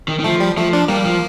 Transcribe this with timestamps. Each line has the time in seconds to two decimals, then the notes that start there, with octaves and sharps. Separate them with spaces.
0.08 D#3
0.19 D#3
0.24 F3 A3
0.40 G3
0.57 F3 A3
0.73 D4
0.88 G3 A#3
1.06 F3